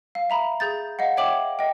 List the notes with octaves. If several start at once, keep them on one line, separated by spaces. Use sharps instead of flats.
F5
E5 A#5 B5
G#4 G6 A6
D#5 F5 F#5
C#5 E5 G5 D6 F#7
D#5 G5